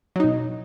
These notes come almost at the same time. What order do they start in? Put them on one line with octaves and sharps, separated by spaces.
F#3 D#4 B2